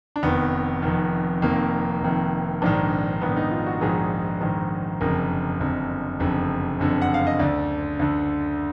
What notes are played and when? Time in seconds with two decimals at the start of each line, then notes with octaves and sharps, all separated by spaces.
0.16 D4
0.23 F1 F2 D#3 B3
0.82 F1 F2 D#3
1.42 F1 F2 D#3 A#3
2.02 F1 F2 D#3
2.62 A#1 G#2 D#3 D4
3.21 A#1 G#2 D#3 B3
3.37 D#4
3.51 F4
3.66 F#4
3.81 A#1 G#2 D#3 G#4
4.41 A#1 G#2 D#3
5.01 F#1 F2 D3 A#4
5.60 F#1 F2 D3
6.20 F#1 F2 D3
6.80 F#1 F2 D3
7.02 F#5
7.14 F5
7.27 D#5
7.39 D2 D3 D5
7.99 D2 D3